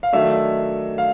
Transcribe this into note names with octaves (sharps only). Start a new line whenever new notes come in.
F5
D#3 F#3 A3 D4 E5
F5